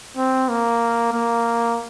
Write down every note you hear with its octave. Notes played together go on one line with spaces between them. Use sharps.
C4
A#3
A#3